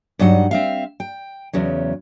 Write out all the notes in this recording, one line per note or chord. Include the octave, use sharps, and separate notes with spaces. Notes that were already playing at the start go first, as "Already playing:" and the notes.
G2 F#3 D#4 F#5
C4 E5 F5
G5
E2 C#3 F#3